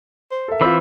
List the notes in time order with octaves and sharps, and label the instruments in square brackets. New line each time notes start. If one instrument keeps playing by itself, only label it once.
[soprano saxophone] C5
[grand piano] A4 A#4 E5
[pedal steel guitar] E3 B5 E6 [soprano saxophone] C4 [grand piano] F4 C5 D6